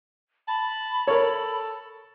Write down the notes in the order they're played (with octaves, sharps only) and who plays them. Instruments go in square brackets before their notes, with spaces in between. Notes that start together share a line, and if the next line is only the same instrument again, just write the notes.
[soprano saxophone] A5 [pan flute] B5
[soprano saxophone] A4 [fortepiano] A#4 C#5